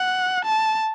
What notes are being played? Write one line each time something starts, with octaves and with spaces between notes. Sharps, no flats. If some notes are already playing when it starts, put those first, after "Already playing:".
Already playing: F#5
A5